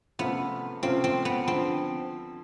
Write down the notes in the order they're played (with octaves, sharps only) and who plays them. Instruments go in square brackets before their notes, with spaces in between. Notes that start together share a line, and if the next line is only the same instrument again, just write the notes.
[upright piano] C3 F3 A3 C#4 F4 [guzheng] B3
[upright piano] C3 F3 A3 C#4 F4 [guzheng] C4
[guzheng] C4
B3
[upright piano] D3 F3 [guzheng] C4